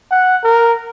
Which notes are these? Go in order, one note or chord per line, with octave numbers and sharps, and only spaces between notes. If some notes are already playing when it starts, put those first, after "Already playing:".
F#5
A#4